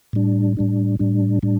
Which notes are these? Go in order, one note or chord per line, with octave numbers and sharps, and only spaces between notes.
A2 G3 D4
A2 G3 D4
A2 G3 D4
A2 G3 D4